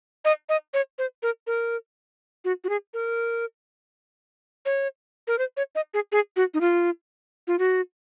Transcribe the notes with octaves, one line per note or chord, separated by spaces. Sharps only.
D#5
D#5
C#5
C5
A#4
A#4
F#4
F#4
G#4
A#4
C#5
A#4
C5
C#5
D#5
G#4
G#4
F#4
D#4
F4
F4
F#4